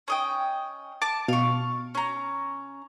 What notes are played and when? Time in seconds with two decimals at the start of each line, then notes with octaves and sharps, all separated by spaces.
0.08 C#4 D#5 G5
1.02 A5 D6
1.28 B2 F5 C#6
1.95 C#4 A#5